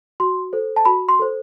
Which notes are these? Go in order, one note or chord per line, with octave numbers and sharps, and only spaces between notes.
F#4 C6
A4 C5
A5
F#4 B5
C6
A4 C5